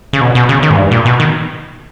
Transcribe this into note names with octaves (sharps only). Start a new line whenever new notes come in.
C#3
B2
B2
C#3
D#3
G#2
G2
A#2
B2
D#3